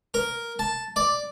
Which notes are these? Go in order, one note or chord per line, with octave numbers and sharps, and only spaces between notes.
A#4
A5
D5